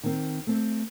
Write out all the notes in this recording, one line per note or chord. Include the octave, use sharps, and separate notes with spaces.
D#3 C4
A3 C4